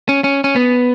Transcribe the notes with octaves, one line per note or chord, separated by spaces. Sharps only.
C#4
C#4
C#4
B3